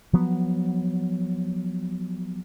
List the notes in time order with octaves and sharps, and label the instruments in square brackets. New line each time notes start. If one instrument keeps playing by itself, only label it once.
[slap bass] F3 F#3 B3